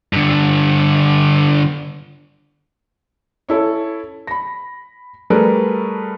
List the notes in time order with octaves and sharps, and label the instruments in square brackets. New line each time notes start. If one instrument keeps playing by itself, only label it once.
[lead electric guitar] G2 D3
[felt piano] C#4 E4 A4
B5 A#6
G3 A3 G#4 A#4 B4